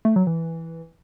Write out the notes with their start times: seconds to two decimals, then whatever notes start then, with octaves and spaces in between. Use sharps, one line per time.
0.05 A3
0.16 F#3
0.27 E3